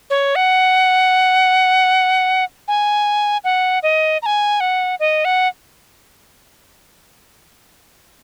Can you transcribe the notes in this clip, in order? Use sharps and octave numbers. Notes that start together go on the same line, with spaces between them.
C#5
F#5
G#5
F#5
D#5
A#5
G#5
F#5
D#5
F#5